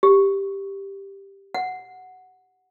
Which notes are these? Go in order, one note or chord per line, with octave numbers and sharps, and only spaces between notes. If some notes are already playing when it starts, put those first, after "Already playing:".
G4
F#5